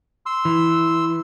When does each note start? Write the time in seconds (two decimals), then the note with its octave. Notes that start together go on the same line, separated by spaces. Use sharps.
0.26 C6 E6
0.45 E3